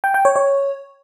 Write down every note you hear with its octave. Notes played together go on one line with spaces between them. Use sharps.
G5
G5
C#5
C#5